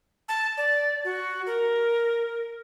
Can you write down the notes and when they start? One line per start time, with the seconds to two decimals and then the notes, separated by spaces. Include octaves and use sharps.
0.29 A5
0.57 D5
1.04 F#4
1.47 A#4